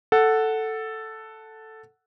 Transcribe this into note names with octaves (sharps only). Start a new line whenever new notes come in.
A4 F#5